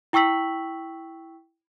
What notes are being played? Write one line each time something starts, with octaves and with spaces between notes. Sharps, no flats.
E4 G5 C#6 E6 B6 F#7